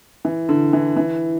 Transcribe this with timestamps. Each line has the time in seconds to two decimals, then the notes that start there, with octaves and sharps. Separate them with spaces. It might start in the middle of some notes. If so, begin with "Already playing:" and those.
0.25 E3
0.49 D3
0.73 E3
0.96 E3